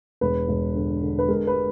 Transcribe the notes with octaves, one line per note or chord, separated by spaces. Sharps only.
E1 B4
E1
D3
D3
B4
G#3 A#4
B4